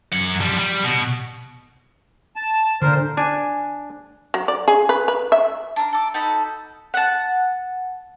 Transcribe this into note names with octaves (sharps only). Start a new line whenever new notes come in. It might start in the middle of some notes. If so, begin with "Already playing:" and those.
F#2 F#5
F3 G3
G3
B2
A5
A#2 D3 A#4 C5
D4 G#5
F#3
D5
G#4
B4
B4
E5
D4 A#4
A4 D6
D#4 F#4 A4 B5
F#5 A5